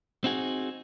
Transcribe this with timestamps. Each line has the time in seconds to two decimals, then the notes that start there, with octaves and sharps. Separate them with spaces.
0.24 C4 D#4 F#4 G#4